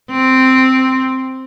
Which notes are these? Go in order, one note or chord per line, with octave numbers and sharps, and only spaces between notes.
C4